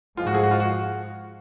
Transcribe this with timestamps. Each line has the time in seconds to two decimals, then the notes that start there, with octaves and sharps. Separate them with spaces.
0.17 G#2 F3 G#3 F4
0.27 F#4
0.35 G#4
0.43 F#4
0.51 F4
0.60 F#4